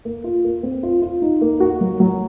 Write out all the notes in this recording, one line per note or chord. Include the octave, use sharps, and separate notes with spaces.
A#3
F4
A#3
C4
F4
F4
D#4
A#3
F#4
F#3
F#3